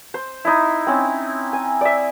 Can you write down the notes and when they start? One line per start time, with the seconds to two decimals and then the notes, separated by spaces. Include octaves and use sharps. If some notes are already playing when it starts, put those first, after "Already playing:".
0.14 C5
0.45 D#4 E4
0.87 C4 C#4
1.53 G#5
1.81 D5 E5